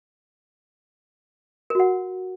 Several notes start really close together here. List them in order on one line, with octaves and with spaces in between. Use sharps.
A#4 F#4 F#5